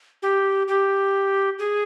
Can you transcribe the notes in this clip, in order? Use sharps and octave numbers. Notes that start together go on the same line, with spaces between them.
G4
G4
G#4